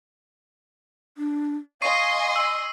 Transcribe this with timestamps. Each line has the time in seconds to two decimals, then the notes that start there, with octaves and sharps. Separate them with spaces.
1.18 D4
1.82 D#5 F5 G#5 C6 C#6 C7 D#7
2.36 E6